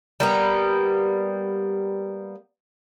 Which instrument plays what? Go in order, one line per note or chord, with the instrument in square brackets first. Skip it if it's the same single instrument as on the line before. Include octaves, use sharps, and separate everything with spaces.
[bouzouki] G3 A#3 B3